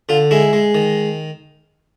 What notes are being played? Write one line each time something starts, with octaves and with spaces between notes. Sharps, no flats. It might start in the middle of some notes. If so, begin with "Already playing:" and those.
D3 F4
G#3 E4
G#3
D#3